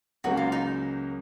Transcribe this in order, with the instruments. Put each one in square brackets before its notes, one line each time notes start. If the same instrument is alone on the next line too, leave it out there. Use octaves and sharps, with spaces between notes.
[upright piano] C#2 C#3 F#3 A#3 C#4 [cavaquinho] F#4
[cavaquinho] F4
D#4